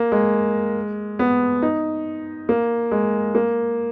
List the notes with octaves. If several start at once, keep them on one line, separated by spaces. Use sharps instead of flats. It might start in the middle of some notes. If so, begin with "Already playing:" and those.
Already playing: A#3
G#3
B3
D#4
A#3
G#3
A#3